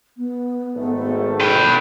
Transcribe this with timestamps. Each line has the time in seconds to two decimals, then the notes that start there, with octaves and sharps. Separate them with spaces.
0.17 B3
0.76 G#1 A3
1.41 B4 G5